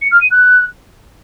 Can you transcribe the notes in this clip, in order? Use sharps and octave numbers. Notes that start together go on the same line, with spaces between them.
C#7
F6
D#7
F#6